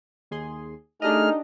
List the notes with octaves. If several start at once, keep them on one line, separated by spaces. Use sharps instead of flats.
D#2 G#4 C6
A3 D4 D#4 G4 G#4 D#5 F6